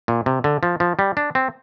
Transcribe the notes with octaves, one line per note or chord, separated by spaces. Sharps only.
A#2
C3
D3
F3
F3
G3
D4
C4